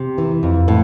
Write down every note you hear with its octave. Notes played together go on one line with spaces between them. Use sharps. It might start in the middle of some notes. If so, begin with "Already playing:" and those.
Already playing: C3
E3
F2
A2